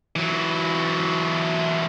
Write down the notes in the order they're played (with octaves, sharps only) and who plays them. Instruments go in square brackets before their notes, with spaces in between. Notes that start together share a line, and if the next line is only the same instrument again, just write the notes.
[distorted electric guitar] E3 F#3